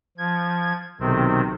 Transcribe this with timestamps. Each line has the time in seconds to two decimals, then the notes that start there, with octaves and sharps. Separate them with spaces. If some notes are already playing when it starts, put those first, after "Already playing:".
0.18 F3 G#6
1.00 B1 C3 D#3 C4